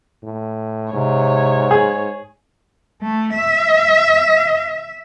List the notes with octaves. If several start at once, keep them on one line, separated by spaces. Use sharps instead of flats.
A2
G#2 C3 C#5
G#4
A3
E5